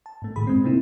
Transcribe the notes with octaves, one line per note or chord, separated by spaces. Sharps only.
A5
G#2 A3
A2 D#3 G#4 B5
G2 G#3 C4
C3 A3 A#3 C4 D#4 E4